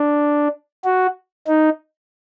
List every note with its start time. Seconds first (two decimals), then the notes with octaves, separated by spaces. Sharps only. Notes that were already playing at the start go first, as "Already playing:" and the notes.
Already playing: D4
0.85 F#4
1.48 D#4